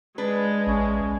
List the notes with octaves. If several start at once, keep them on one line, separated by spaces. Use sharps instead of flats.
G#3 D4 B4
A1 C#4